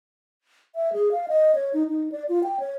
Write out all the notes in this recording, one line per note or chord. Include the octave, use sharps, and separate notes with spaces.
E5
G#4
F5
D#5
C#5
D#4
D#4
D5
F4
G5
C#5